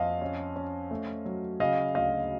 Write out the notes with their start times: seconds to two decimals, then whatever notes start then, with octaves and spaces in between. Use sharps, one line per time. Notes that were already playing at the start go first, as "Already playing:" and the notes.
Already playing: F2 D#5 F5
0.21 C#4
0.56 C#4
0.91 A3
1.25 F#3
1.60 C#3 D#5 F5
1.95 D2 D#5 F5